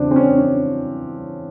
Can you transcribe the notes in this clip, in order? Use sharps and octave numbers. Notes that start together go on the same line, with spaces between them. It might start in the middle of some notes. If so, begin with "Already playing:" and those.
Already playing: E2 C#3 F#3 C4 D4
C4
C#4
C#4